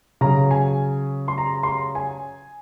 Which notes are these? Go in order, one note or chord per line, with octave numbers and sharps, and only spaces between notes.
C#3 F#3 A#5
G#5
C6
A#5
C6
A#5
G#5